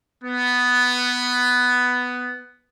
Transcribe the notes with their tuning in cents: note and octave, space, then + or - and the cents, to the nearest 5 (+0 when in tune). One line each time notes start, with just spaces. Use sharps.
B3 +5